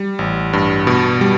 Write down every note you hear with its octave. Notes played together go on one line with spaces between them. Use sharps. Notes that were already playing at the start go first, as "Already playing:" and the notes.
Already playing: G3
A1
G2
B2
G3